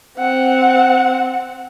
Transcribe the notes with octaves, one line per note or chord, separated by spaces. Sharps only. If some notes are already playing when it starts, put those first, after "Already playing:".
C4 F#5